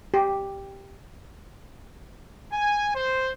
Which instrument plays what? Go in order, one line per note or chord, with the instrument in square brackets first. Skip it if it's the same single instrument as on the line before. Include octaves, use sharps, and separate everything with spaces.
[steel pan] G4
[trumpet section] G#5
C5